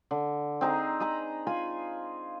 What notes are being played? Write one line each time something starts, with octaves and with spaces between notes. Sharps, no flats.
D3
C4 D#4 G#4 A#5
D#5 G#5 A#5 B5
F4 G#5 B5